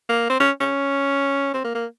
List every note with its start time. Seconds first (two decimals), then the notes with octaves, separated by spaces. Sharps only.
0.09 A#3
0.29 C4
0.40 C#4
0.60 C#4
1.54 C4
1.64 A#3
1.75 A#3